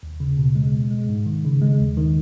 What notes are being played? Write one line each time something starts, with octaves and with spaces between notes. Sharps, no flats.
D#2
C#3
B2
G#3
B2
G#3
G#2
D#3
C#3
G#3
D#2
D#3